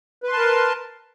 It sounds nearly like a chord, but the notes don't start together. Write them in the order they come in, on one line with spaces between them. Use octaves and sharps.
B4 C6 A5 A#4